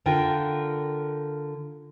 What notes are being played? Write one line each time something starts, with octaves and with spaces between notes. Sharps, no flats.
D3 F4 A#4 G5